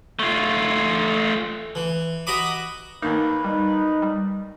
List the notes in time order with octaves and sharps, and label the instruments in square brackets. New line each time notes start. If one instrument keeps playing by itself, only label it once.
[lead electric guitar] A3 F4
[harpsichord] E3
F#4 D#5 A#5 B5 D6
[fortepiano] D#2 A#3 [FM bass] D#4 [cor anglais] B4
[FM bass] G3 [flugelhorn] D#4
[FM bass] G3